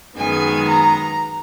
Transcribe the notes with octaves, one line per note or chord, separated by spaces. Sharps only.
F#2 D#3 G#3 B3 G#5
A#5